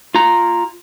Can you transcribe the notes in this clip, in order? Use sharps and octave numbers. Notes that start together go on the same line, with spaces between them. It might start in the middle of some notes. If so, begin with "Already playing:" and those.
F4 A#5